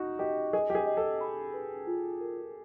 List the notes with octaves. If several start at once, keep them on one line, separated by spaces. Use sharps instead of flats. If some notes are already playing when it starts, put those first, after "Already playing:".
Already playing: D#4 F#4
G4 D#5
G#4 D#5
G4
G#4
D#5
A4
B5
B4
F4
A#4